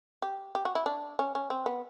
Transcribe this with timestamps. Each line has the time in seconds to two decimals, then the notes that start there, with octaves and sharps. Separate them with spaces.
0.22 G4
0.55 G4
0.65 F#4
0.75 E4
0.86 D4
1.19 C#4
1.35 C#4
1.50 C4
1.66 B3